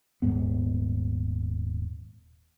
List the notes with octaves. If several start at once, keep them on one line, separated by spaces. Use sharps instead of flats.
D#1 G#1 G#2 B3